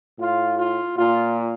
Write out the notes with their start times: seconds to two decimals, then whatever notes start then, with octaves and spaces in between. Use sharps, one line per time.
0.19 A2 F4
0.58 F4
0.97 A#2 F4